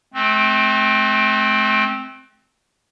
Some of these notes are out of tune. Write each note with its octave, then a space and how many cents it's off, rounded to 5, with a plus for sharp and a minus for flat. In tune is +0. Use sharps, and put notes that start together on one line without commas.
A3 -45 C4 +0